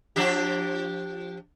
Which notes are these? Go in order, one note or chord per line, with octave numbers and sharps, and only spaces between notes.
F3 D4 G4